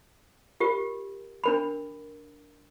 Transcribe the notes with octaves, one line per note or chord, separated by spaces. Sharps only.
F4 G4 A#4
D4 A#4 B5